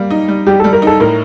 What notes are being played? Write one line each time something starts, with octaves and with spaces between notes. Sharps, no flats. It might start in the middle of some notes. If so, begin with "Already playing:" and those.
Already playing: G3 A#3
D#4
G3
G3 G4
A4
G3
A#4
D#4 A4
A2 A#4